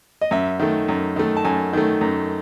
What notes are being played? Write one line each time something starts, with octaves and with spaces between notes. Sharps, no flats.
D#5
F#2 E5
D#3 A3
F#2
D#3 A3
A5
F#2 G#5
D#3 A3
F#2